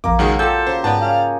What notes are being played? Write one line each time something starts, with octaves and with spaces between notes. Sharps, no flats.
A#1 F2 A#3 A#4 F5 D6
C#2 D#3 F#3 G#3 C#6
F4 G4 A4 G6
C#3 C5
G#2 B3 D5 A5
G#4 C#5 F5